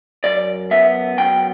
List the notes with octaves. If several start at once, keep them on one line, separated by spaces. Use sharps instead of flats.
F#2 D5
B3 E5
F#2 G5